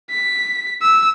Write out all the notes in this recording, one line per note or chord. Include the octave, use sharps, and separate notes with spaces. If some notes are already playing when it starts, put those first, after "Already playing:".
B6
E6